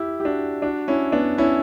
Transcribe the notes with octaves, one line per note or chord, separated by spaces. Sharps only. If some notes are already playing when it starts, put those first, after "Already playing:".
Already playing: E4 G4
G4
D4 F#4
D4 F#4
C#4 E4
B3 D4
C#4 E4